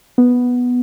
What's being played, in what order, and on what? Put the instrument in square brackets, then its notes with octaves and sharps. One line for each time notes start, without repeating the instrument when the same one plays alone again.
[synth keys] B3